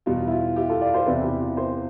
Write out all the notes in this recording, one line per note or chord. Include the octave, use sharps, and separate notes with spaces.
E2 B2 G3 F4
E4
F4
E4 G4
F4 A4
D5 F5
C5 E5
E2 C3 E3 B4 D5
E4 G4
F4
C5 E5